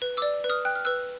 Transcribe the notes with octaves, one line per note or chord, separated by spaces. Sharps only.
B4
D6 E6
D5
B4
D#6 F6
G5 F#6
F6
B4 E6 F#6